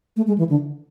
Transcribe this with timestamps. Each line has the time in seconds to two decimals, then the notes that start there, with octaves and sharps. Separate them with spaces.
0.17 A3
0.27 G#3
0.38 E3
0.49 D3